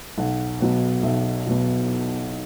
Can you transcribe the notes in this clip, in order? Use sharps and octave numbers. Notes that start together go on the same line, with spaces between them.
B1 F#5
B2 F#3 B3 F#5
B1 E5
B2 F#3 B3